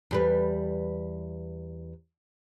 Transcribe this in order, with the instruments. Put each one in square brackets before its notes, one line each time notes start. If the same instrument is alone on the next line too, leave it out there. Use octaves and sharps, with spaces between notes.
[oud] E2 G3 B4